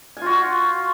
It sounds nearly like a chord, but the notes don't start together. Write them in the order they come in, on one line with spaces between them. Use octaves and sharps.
G#5 F4 F#4